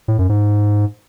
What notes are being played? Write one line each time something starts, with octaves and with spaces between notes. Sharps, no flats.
A2
F#2
G#2